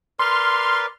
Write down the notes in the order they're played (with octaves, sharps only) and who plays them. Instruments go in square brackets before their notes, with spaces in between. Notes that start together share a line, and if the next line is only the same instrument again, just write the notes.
[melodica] A#4 B4 D5 [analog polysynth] C6 F6